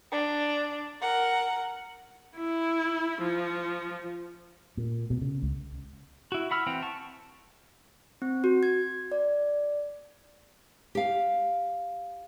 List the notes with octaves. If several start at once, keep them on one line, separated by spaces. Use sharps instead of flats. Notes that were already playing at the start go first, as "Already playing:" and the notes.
D4
A#4 F#5
E4
F3
A#2
B2
C#3
C#2
E4 F#4
F#5 B5 E6 F6
E3 C4 F#5 G5
A5 C#6
C4
F#4
G#6
D5
G4 F5